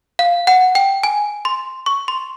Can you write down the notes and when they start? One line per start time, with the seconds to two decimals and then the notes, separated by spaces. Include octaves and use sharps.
0.19 F5
0.47 F#5
0.75 G5
1.03 G#5
1.45 C6
1.86 C#6
2.08 C6